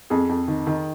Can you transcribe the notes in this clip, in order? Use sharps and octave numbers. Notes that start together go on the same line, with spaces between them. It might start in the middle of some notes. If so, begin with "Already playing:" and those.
F2 G#4
F2
D#3
D#3